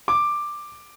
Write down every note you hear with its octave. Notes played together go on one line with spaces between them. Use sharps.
D6